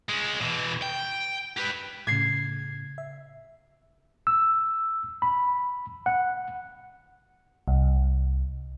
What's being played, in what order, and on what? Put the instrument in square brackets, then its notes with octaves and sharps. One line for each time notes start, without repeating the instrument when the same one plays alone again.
[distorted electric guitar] G#3 C#4
B2 E3
G5
G4 B4
[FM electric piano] A2 C#3 [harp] G#6 C7
[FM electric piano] E5
[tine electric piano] E6
B5
F#5
[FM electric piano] C2